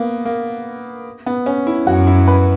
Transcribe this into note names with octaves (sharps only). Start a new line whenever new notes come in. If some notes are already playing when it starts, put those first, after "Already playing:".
Already playing: A#3 B3
A#3
B3
C#4
E4
F#2 F#4
E4
B4